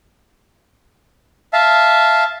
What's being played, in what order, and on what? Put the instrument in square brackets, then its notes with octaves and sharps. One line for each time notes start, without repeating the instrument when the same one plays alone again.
[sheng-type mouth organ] E5 F5 A5